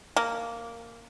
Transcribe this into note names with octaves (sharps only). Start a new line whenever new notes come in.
A#3